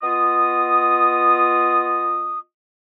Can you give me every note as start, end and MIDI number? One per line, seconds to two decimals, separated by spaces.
0.02 2.38 59
0.02 2.38 65
0.02 2.38 75
0.02 2.38 87